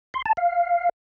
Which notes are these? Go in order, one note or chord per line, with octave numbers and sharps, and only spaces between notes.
C6
A5
F5